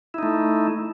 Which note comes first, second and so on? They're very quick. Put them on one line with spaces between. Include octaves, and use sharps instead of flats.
E4 D#4 A3